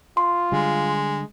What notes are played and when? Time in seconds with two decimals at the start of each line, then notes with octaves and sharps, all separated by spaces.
0.17 F4 C6
0.52 D3 G3 G#3